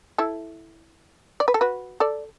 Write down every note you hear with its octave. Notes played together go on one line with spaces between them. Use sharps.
E4 A4
D5
B4
A4
F#4 B4
A4 D5